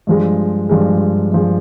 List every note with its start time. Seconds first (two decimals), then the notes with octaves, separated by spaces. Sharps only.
0.07 G2 F3 G#3
0.69 G2 F3 G#3
1.32 G2 F3 G#3